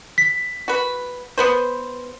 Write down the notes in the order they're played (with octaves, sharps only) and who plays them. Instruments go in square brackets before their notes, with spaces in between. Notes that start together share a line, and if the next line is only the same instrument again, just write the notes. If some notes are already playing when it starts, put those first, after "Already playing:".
[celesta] B6
[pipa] F#4 B4
B3 B4 C5